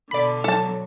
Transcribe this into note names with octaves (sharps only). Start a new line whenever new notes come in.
B2 D3 D5 B5
F#3 A4 A5